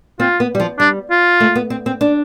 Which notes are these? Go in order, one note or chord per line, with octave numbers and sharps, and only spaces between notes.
C4 F4
B3
G3
F3
G3 D4
F4
A3
B3
C4
C4
D4